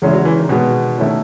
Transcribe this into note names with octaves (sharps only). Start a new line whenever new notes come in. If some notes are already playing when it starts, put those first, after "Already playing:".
E2 C#3 G#3 C#4 E4
F#3
E3
D#3
B2 D#3 G#3 B3
D#3 A3 C#4 E4